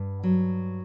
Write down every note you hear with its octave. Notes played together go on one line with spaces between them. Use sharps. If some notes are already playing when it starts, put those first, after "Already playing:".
Already playing: G2
F#3